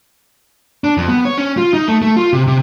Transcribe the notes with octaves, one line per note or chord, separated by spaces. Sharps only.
D4
F2
B3
C#5
C#4
F4
D#4
A3
A3
F4
C3
C3